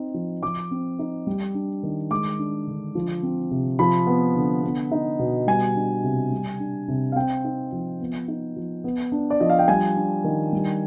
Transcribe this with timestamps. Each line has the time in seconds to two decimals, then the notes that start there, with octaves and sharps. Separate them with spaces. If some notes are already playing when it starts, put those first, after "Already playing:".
Already playing: C4 D#4
0.14 F3
0.43 F3 D6
0.71 C4
0.99 D#4
1.27 G3
1.54 D4
1.83 D#3
2.11 G#3 D6
2.39 D4
2.67 D3
2.95 F3
3.23 C4
3.51 C3
3.79 F3 B5
4.07 B3
4.36 D3
4.63 B3
4.92 D#4
5.19 B2
5.47 G3 G#5
5.76 D4
6.04 C3
6.32 G3
6.59 D4
6.88 C3
7.12 F5
7.16 C4 G5
7.44 D#4
7.72 F3
8.00 B3
8.28 D#4
8.56 F3
8.84 B3
9.12 D4
9.30 D5
9.40 F3 D#5
9.50 F5
9.59 G5
9.68 G3 G#5
9.97 D4
10.24 D#3
10.53 G3